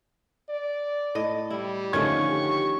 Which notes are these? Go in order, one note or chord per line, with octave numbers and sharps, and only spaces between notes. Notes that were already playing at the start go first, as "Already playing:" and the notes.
D5
A2 D#5
G3 E4
D3 D#3 F3 A3 C#4 C#6 G#6
G4